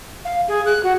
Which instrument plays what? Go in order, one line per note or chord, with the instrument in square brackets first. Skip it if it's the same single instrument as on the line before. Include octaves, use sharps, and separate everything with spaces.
[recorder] F5
G#4
F#6
F#4